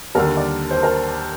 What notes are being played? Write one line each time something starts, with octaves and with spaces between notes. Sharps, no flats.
D#2 D3 A#4
D5
C5
A#4